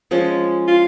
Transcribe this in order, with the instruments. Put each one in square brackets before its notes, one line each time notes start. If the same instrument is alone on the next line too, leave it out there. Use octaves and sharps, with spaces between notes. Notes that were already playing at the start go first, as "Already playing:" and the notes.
[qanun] F3 G#3 C#4
[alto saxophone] F4